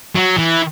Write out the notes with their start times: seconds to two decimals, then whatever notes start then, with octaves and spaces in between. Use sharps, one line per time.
0.15 F#3
0.38 E3